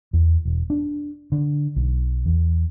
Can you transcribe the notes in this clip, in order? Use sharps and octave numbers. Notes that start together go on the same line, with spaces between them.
E2
E1
D4
D3
B1
E2